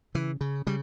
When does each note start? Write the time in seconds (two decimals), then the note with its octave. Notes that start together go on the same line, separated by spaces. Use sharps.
0.15 C#3 E3
0.41 C#3
0.67 C#3 G3